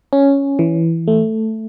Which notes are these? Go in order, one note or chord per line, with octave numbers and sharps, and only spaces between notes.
C#4
E3
A3